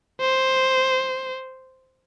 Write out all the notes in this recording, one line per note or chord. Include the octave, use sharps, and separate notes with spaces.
C5